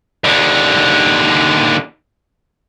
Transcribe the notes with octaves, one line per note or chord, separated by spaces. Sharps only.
D#2 D3